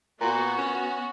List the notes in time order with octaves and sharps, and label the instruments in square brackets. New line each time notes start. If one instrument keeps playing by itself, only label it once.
[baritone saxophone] A#2 [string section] B3 F#4
[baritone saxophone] C#4